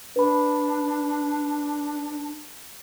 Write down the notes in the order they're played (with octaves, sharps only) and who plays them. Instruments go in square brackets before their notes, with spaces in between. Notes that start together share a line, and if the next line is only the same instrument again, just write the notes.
[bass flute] D4 [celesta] B4 B5